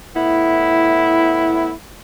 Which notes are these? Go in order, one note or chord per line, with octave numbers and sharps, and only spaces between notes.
A2 B3 E4